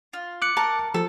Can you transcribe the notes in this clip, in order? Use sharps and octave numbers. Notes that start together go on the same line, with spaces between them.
F4
D6 F#6 C#7
A#4 A5
F3 A4